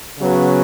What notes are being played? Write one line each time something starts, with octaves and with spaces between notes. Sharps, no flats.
C#3 F#3 B3